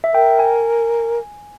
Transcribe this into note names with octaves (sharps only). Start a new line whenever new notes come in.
E5
A#4 G5
G#5